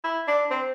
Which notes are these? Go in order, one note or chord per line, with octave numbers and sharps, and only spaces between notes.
E4
D4
C4